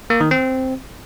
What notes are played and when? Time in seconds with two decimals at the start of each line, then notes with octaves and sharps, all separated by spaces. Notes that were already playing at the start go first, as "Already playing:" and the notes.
0.10 A#3
0.21 D#3
0.31 C4